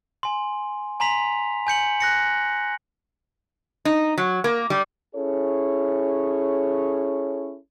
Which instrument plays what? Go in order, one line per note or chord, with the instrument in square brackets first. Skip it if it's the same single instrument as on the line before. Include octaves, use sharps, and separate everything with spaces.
[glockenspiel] G#5 C6
G#5 A#5 C6 B6 F7
G#5 G6 C#7 F#7
F#6 A#6 C#7
[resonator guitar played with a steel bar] D#4
F#3
A#3
G3
[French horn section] C#4 E4 G#4 A4 C#5